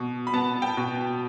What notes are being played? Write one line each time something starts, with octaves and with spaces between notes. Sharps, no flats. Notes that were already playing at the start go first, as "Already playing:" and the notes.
Already playing: B2
B5
B3 A5
G5
B2